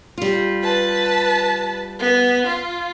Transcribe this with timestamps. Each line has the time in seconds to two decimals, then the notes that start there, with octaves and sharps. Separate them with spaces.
0.18 G3 F4
0.62 B4 A5
1.99 B3
2.47 F4